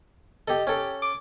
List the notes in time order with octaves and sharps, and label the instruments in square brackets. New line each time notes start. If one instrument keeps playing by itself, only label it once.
[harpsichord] G4 A4 [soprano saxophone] D#5
[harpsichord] C#4 A4 [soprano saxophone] G4
[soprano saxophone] D6